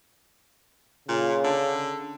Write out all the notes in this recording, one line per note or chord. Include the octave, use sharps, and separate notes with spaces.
A#2 C#3
D3